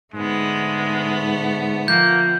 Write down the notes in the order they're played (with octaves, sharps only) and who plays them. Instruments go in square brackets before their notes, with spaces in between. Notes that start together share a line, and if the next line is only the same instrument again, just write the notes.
[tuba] G#2 [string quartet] D3 A3 B3 [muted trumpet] G#3
[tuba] F3 [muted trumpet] A#3 [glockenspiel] G6